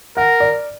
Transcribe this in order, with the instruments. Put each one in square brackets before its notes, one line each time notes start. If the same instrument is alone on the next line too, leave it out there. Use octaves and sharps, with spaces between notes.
[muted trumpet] A#4 [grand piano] F#5
[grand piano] D5